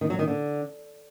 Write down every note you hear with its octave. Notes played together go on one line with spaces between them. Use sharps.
D#3
F#3
D#3
D3